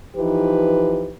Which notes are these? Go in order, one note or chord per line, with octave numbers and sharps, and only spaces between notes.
E3 F3 D#4 G4 B4